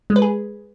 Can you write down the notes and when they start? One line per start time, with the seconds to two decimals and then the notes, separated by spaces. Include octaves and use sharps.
0.10 G#3
0.16 B4
0.22 G#4